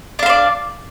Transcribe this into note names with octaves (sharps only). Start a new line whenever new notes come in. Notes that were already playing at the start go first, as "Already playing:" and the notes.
D4 C5 D5 F5